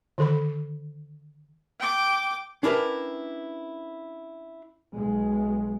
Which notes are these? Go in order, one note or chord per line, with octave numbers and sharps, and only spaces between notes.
D3 D#3 A4 C5 B5
G5 D6
C#4 D4 E4 G4 A#4 B4
B1 G#3